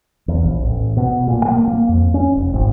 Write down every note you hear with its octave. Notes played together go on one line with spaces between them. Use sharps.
E2
A#1
A1
B2
A#2
A#3
A#3
F2
C#4
F1
G#1